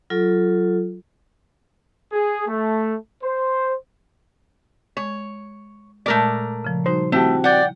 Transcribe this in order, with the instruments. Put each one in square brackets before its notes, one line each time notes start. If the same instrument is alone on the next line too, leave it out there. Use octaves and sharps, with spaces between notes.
[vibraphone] F#3 F4 A4
[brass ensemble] G#4
A3
C5
[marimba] G#3 [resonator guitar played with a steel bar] C#5
[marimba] A#2 G#3 [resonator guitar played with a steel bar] A3 A#4 D5
[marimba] C#3 F3
[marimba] G3 D#4 F#4 [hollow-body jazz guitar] C5
[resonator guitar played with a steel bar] A3 [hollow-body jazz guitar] C4 F#4 G4 [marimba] E4
[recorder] D5 [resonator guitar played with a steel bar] F#5 G5